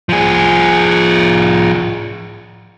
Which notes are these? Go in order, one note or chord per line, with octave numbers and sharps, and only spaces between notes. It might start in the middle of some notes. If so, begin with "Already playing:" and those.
F3 G#4